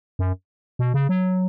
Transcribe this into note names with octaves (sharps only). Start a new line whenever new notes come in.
F#2
B2
C#3
F#3